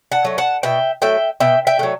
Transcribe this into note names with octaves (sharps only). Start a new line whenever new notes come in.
F#5 A5
F#3 A3
F#5 A5
B2 E5 G5
F#3 A3 E5 G5
B2 E5 G5
E5 G5
F#3 A3